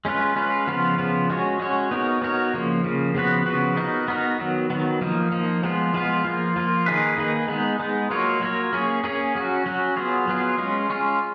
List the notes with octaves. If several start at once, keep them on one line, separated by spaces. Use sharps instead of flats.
G#3 C#4 F4 B4
G#3 C#4 F4 B4
C#3 F3 B3 F4
C#3 F3 B3 F4
G#3 C#4 F#4 C#5
G#3 C#4 F#4 C#5
B3 D#4 F#4 A#4 C#5
B3 D#4 F#4 A#4 C#5
C#3 F3 A#3
C#3 F3 A#3
C#3 F3 B3 F#4 B4
C#3 F3 B3 F#4 B4
B3 D#4 F#4 A#4
B3 D#4 F#4 A#4
D#3 F#3 B3
D#3 F#3 B3
F3 A#3 D#4
F3 A#3 D#4
F3 G#3 B3 F4
F3 G#3 B3 F4
F3 A#3 F4
F3 A#3 F4
D#3 A#3 D#4 G#4 B4
D#3 A#3 D#4 G#4 B4
G#3 B3 D#4
G#3 B3 D#4
F#3 A#3 F4 A#4 C#5
F#3 A#3 F4 A#4 C#5
A#3 C#4 G#4 C#5
A#3 C#4 G#4 C#5
F#3 C#4 F#4
F#3 C#4 F#4
F#3 B3 F4 G#4
F#3 B3 F4 G#4
G#3 C#4 F4
G#3 C#4 F4